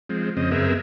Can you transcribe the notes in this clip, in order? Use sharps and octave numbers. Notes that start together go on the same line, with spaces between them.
F3 G#3 C4
F2 C#3 C4 D#5
F#2 B3 C4 G#4 A#4 E5